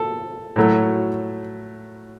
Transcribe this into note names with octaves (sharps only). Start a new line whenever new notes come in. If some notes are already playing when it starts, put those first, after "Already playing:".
Already playing: A4
A2 F#3 A3